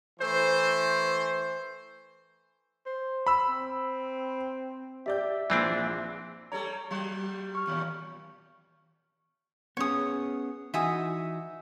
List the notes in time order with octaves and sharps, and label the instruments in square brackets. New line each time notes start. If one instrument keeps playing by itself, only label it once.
[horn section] E3 A3 C5
[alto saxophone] C5
[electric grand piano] B5 E6
[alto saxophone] C4
[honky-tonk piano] G4 D5 G6 [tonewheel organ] E5
[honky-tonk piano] A#1 A#2 [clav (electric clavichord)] E3 C4 D4
[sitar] G3 A4 C#5 [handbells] A#5
[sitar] F#3 G3
[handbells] C#6 F6
[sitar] D#2 A#2
[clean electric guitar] B3 C#4 G#4 [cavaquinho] C#5 D#6
[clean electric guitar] E3 D#4 F#4 [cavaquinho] E5 G#5 D#6